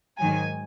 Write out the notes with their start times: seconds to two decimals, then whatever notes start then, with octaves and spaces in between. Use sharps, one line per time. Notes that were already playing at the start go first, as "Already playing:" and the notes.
0.19 G#2 D#3 F#3 G#5